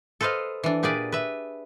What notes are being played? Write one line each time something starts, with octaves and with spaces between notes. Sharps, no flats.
A4 B4 C5 D#5 F5
E3 D4
A#2 G4 G#4 B4 D5
B4 E5